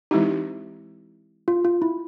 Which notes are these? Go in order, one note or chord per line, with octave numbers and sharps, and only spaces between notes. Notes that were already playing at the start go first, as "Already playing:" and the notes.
E3 G#3 C4 D#4 E4 G4
F4
F4
E4